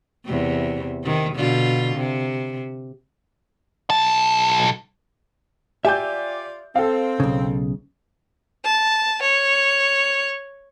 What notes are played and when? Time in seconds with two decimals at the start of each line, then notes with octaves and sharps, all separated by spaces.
0.25 E2 C3
1.03 C3 D#3
1.34 B2 D3 F4
1.97 C3
3.90 B1 A5
5.85 F4 G4 D5 E5 G#5 G6
6.76 C4 A4 F5
7.20 B1 C#3
8.64 A5
9.22 C#5